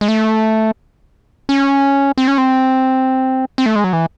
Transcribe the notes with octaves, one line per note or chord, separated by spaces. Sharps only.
G#3
A3
C#4
C4
C#4
C4
C4
A3
G#3
F#3
E3